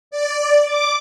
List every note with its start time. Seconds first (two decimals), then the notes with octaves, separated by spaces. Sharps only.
0.11 D5
0.64 D6